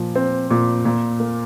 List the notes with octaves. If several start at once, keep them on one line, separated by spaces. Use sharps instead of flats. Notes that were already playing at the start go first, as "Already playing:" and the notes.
Already playing: A#2 F3
C4
A#2
A#2
A#3